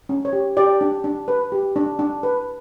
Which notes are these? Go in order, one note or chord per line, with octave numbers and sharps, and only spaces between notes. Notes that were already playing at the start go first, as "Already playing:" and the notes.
C#4
C#5
G4
G4 D5
D4
D4
B4
G4
D4
D4
B4